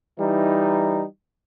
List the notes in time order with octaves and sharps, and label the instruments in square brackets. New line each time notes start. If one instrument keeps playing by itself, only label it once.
[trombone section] E3 G3 D#4